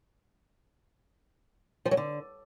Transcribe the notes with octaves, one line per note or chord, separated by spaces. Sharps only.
F3
F#3
D3